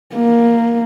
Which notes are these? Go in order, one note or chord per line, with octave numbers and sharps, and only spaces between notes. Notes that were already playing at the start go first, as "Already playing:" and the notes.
A#3